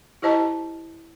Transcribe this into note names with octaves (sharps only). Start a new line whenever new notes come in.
E4 G4 C5 D#5 A5 A#5